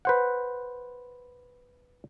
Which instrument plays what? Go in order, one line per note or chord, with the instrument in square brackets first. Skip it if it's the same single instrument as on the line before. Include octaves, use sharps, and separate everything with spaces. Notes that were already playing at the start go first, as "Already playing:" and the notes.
[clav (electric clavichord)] B4 C5 F#5